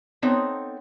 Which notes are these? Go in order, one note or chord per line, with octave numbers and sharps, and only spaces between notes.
B3 C4 D#4 A4 C#5